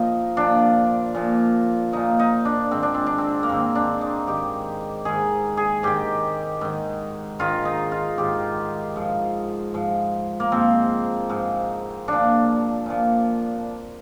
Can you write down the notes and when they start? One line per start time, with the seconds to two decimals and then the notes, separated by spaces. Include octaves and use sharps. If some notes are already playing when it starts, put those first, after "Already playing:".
Already playing: A#2 F3 D#4
0.37 A#2 F3 D4
1.15 A#2 F3
1.93 A#2 F3 D#4
2.19 D#4
2.45 D4
2.71 G#2 D#3 C4
2.83 D4
2.94 C4
3.06 D4
3.18 C4
3.43 A#3
3.49 G#2 D#3 C4
3.75 D4
4.01 D#4
4.27 G#2 D#3 G4
5.05 G#2 D#3 G#4
5.57 G#4
5.83 G#2 D#3 G4
6.61 G#2 D#3
7.39 G#2 D#3 F4
7.65 D#4
7.92 F4
8.18 G#2 D#3 G4
8.96 G#2 F3
9.74 G#2 F3
10.40 A#3
10.52 G#2 F3 C4
11.30 G#2 F3
12.08 A#2 F3 D4
12.86 A#2 F3